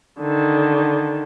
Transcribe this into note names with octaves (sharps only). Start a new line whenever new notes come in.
D3 D#3